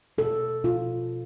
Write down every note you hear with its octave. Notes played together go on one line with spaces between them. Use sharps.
B2 A4
B2 F4